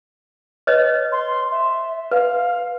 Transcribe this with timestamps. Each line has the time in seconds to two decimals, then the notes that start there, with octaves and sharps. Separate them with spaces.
0.67 B4 C#5 D#5
1.12 C6
1.51 E5
2.11 B4 F5